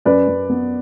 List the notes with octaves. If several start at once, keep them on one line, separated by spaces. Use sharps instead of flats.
F#2 B4 D5
F#2
B3